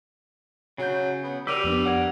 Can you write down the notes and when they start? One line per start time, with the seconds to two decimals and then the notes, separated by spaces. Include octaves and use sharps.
0.78 C#3 F#3 G6
1.23 B3
1.47 G3 G4 A#4 E6 D#7 F7
1.64 F2 B3 D4 B4
1.86 A#4 D5 F#5 E6 G#6